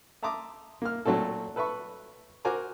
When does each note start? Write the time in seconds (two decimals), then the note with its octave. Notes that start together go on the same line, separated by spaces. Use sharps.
0.23 E5 A5 A#5 C6 D6 D#6
0.82 A#3 F6
1.05 A#2 F#3 A3 C4 A4
1.56 A4 B4 E5 B5 C#6
2.45 F#4 A#4 C5 G#5 A#5 D6